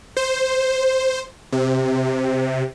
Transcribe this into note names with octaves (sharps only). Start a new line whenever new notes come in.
C5
C3